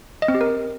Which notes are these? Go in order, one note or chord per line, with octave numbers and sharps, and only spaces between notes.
D#5
C4
G4
A#4